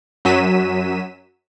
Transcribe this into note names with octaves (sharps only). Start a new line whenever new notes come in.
F#2 F#3 B6 D#7 E7